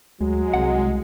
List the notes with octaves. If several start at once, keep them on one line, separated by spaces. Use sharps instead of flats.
D2 F#3 G#3
C2 C3 F#5